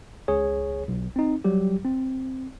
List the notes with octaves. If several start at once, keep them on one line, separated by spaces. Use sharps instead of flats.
C#2 G#4 C#5
B1
C4 D#4
F#3 G3 G4
C4